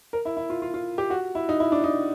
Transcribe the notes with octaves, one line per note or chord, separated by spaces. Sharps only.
A#4
E4
E4
F4
F4
F4
G4
F#4
E4
D#4
E4
D4
D#4